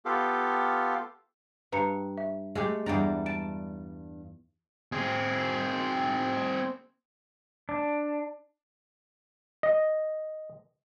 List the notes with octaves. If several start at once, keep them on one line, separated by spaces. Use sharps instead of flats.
B3 F4 G4 A4 F5
G2 B4 A#5 C#7
E5
G#3 A3 G4
E2 G2 D4 G5 A#5
A5 D7
C4 G#4
D4
D#5